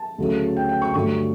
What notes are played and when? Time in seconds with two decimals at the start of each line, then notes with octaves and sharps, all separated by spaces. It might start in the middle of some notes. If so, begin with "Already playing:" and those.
Already playing: A5
0.18 D2 C#3 F#3 A3
0.57 G5
0.69 G5
0.82 C#6
0.94 G2 D3 F#3 A3 C#6